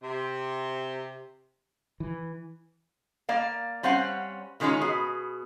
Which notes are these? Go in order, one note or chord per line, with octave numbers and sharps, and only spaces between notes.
C3
E3
A#3 D5 F5
G3 C4 C#4 F5 F#5
B2 D#3 G#3 C#4 F4 A#5
B2 G#4